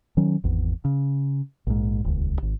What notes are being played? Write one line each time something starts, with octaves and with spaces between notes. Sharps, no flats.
D#3 F#3 C#4
G#1 E2
C#3
A#1 G#2
D#1 C#2
G#1